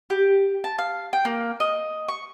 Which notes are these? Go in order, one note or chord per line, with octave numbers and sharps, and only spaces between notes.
G4
A5
F5
G5
A#3
D#5
C#6